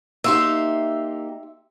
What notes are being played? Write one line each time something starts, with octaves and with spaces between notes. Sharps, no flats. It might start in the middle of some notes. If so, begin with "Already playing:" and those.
A#3 D#4 G4 E5 C6